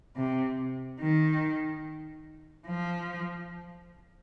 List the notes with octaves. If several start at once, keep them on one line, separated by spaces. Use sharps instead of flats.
C3
D#3
F3